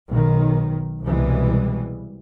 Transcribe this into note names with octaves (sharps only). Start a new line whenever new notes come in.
B1 D#3
C2 B2 E3 G3 G#3